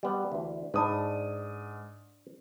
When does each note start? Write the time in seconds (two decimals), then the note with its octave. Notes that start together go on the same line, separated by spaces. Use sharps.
0.03 G3 B3
0.32 D2 E3
0.74 G#2 D4 B4 D#6